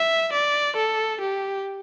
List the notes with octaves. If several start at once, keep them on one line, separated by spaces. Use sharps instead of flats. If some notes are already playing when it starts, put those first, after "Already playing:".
Already playing: E5
D5
A4
G4